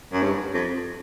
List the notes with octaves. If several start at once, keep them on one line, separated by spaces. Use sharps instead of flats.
F#2
G2
F2